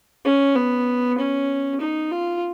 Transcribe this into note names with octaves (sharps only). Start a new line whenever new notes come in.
C#4
B3
C#4
D#4
F4